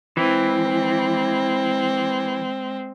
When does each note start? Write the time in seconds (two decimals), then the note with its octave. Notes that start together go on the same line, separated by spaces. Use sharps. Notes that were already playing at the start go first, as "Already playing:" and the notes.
0.17 E3 G#3 C4